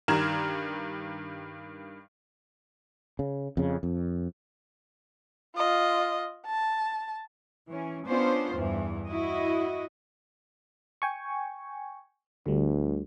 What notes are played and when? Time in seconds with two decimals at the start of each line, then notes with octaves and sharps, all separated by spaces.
0.08 G2 D#3 A#5 F6 G#6 E7
3.19 C#3
3.57 F2 C#3
3.83 F2
5.57 F4 D#5
6.46 A5
7.69 E3 C#4
8.06 B3 C#4 D4 F4 C5
8.55 E2 G2 E3
9.07 E4 F#4 D#5
11.02 G5 G#5 C#6
12.46 D2 D3 G3